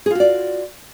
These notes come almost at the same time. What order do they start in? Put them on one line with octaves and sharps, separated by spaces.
G#4 F4 F#4 D5